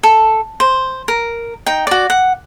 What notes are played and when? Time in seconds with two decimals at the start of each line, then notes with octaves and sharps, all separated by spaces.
0.03 A4
0.60 C5
1.08 A#4
1.66 D#4 G5
1.87 F#4 D5
2.10 F#5